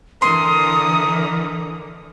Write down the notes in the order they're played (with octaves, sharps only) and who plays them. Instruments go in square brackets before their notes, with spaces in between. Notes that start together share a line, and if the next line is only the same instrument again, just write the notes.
[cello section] D3 E3 [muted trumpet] A#4 [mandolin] C6 [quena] D#6